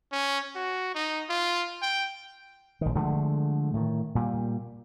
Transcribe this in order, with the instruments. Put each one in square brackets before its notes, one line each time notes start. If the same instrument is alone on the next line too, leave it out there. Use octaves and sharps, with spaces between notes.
[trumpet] C#4
F#4
D#4
F4
G5
[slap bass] A#1 D#3
D3 F3 G#3 A3
A2 D#3
A#2 G3